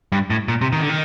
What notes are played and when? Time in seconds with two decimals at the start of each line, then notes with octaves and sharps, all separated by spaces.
0.12 G2
0.30 A2
0.48 A#2
0.61 C3
0.72 D#3
0.81 D3
0.89 D#3